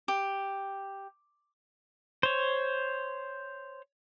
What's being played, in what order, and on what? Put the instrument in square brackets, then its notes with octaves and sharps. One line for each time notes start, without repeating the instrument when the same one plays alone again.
[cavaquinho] G4
[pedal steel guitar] C5 C#5